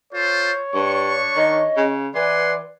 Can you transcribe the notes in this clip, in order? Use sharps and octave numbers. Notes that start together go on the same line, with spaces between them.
F4 A4 C5 C#5
G2 D4 C#6
D#3 D#5
C#3
E3 B4 D5 F#5 G#5 C6